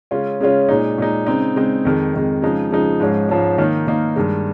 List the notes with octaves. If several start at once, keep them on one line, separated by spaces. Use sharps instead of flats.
C#3 G#3 C#4 F4
C#3 G#3 C#4 F4
A#2 G#3 D#4
A#2 G#3 D#4
C#3 G#3 C4 D#4
C#3 G#3 C4 D#4
F2 D#3 G#3
F2 D#3 G#3
C#3 F3 G#3 D#4
C#3 F3 G#3 D#4
G#2 F3 G#3 C#4
G#2 F3 G#3 C#4
D#3 A#3 D#4
D#3 A#3 D#4
G2 D#3 G#3